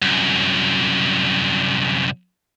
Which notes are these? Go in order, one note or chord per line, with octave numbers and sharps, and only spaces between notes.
C2 F#2